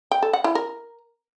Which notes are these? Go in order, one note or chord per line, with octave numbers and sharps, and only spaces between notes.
G5
A4
F#5
E4
A#4